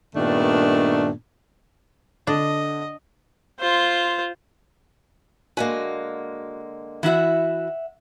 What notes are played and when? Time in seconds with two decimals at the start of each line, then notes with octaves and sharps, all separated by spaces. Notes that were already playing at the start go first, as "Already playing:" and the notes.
0.15 G2 A#2 D#3 A3 B3 D4
2.27 D3 D4 D#5
3.59 F4 C5
5.57 D3 G#3 A#3 F#4 G#5
7.03 E3 E4 F#4 E5 F#5